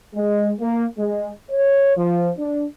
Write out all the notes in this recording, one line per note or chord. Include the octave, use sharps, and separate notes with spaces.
G#3
A#3
G#3
C#5
F3
D4